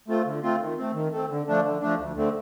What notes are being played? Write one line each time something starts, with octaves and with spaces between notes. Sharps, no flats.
A3 C4 F4
D3
A3 C4 F4
D#3
A3 C4
D#3
A3 C4
D3
F3 A3 D4
D3
F3 A3 D4
D2
D3 A3 C4